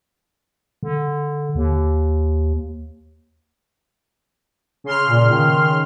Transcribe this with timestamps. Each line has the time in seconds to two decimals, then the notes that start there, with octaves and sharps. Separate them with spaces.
0.83 D3
1.55 D#2
4.84 C#3 C6 F6
5.07 A#2
5.31 D#3